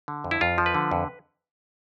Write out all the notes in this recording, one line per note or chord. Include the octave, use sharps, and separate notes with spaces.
D3
F2
E4
F2 F4
F3
B4
D3
F2